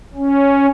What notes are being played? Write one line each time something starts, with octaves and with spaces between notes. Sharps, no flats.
C#4